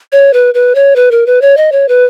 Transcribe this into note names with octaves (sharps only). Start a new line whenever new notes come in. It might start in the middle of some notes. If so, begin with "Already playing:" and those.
C#5
B4
B4
C#5
B4
A#4
B4
C#5
D#5
C#5
B4